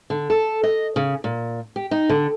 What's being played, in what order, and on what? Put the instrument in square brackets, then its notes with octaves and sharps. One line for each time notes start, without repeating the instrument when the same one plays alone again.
[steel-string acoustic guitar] D3
A4
D#5
C#3
A#2
G4
D#4
D3